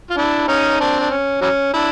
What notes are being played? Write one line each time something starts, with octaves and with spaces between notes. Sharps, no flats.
F4
D4 E4
C#4 D#4
C4 D4
D4
C#4
E3 F#3 C#4
D4 E4